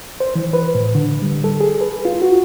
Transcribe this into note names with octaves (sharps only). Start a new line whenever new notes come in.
C5
E3
B4
A2
D3
G3
A4
G#4
B4
F4
F#4